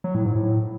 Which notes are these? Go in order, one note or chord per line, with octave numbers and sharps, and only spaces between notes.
F#3
A2
G#2
A2